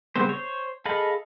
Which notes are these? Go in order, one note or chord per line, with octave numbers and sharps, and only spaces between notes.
C#3 G3 B3 C4 C5
C5 C#5
G#4 A4 D#5 F5 B5